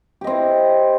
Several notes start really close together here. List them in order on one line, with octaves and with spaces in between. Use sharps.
G4 D#5 C4 E4